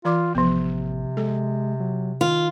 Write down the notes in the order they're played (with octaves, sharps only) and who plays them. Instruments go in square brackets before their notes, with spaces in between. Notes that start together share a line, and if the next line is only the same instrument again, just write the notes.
[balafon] E3 D5 D6 [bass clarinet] F4
[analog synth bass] A1 [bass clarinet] C3 [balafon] F3 B3
[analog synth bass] G#3 [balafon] A4
[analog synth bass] F#3
[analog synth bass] D#3 [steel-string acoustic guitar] F4